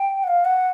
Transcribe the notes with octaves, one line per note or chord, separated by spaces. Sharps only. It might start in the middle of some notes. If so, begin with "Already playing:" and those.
Already playing: G5
F#5
F5
F#5